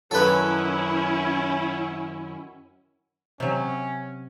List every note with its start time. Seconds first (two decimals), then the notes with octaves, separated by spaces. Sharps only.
0.11 F#2 D#3 F#3 C#4 E4 A4 B4
3.40 C3 F#3 C#4